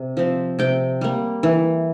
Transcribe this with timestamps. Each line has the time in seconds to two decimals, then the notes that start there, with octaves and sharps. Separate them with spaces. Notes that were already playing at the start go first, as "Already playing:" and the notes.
Already playing: C3
0.17 F3 C4
0.59 C3 G5
1.01 G3 A#3
1.43 E3